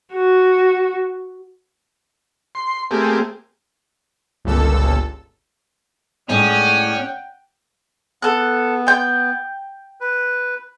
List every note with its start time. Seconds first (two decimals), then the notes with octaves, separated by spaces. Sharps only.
0.13 F#4
2.55 C6
2.91 A3 A#3 C4 G4 G#4
4.45 G1 C#2 A#2 A4 E6
6.29 A2 G#3 C#4 D#4 D5 F#5 G5
8.22 B3 A4 F#6
8.87 G5 G6
10.01 B4